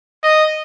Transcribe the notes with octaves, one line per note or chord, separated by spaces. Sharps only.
D#5